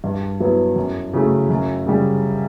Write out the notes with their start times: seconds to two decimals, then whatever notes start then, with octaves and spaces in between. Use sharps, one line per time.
0.04 G2
0.40 F#3 B3 E4
0.76 F#2
1.13 C#3 F#3 A3
1.50 F#2
1.86 C#3 G3